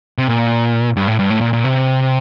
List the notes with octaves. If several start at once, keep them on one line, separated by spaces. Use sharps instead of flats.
C3
A#2
G2
A2
G2
A2
A#2
A#2
C3